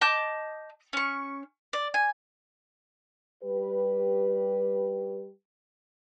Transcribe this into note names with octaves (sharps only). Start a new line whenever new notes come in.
D#5 A5 D6 G6
C#4 C#6
D5
G#5
G3 G4 B4